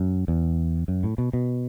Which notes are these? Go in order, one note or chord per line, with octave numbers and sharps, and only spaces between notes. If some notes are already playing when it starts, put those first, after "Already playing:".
Already playing: F#2
E2
F#2
A2
B2
B2